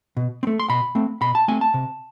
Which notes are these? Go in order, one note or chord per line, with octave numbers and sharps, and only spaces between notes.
B2
C4
A3
C6
B2 B5
A3 C4
B2 B5
A5
A3 C4 G#5
A5
C3